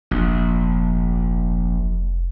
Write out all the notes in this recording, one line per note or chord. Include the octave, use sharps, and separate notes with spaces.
F1 A#1